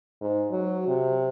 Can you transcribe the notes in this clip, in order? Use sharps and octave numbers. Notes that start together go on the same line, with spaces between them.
G#2
F#3
C3